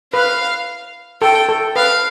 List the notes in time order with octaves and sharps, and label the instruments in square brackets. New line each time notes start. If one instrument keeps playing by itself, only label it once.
[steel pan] B4 [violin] F5
[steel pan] A4 [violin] G5
[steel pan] A4
[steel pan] B4 [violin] F5